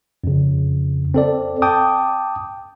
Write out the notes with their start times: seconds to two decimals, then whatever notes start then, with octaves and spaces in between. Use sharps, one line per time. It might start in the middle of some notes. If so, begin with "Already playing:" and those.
0.24 F2 C#3
1.14 C4 A4 D5
1.62 G5 A5 D6 D#6